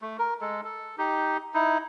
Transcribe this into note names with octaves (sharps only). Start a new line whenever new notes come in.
A3
A#4
G#3 A4
A4
D#4 G4
D#4 E4